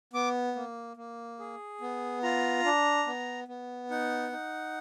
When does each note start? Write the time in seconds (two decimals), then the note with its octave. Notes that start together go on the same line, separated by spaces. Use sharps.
0.13 B3 D6
0.56 A#3
0.97 A#3
1.39 G#4
1.81 B3
2.23 F4 A#5
2.65 D4
3.07 B3
3.48 B3
3.90 D#4 F#5
4.32 D#4